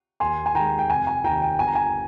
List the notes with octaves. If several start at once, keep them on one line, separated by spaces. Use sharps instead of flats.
D#2 G#5 C6
G#5
D#3 G#3 G5 A#5
G5
F1 G#5
G#5
D#2 D#3 G5 A#5
G5
G1 G#5
A#5
G#5